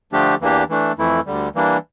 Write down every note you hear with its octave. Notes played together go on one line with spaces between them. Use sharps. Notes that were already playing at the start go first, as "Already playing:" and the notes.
D3 F3 A3 D4 G4
E2 E3 A#3 D4 G4
E3 A3 D4
F2 E3 A3 E4
D2 D3 G3
E3 G3 A#3 D4